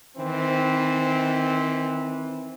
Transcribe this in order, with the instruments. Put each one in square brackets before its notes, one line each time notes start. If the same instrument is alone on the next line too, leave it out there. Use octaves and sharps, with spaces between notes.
[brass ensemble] D#3 E3 C4